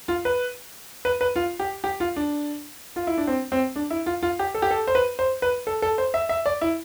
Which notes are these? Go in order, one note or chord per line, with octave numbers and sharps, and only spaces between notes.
F4
B4
B4
B4
F4
G4
G4
F4
D4
F4
E4
D4
C4
C4
D4
E4
F4
F4
G4
A4
G4
A4
C5
B4
C5
B4
A4
A4
C5
E5
E5
D5
E4